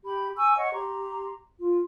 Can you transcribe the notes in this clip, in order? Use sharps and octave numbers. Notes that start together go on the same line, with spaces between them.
G4 B5
G#5 C#6 E6
C#5 D#5 F#5 C#6
G4 A#5 C6
F4